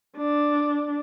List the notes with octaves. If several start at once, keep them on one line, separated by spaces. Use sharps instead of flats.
D4